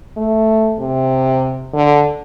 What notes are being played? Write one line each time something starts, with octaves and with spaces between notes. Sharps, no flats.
A3
C3
D3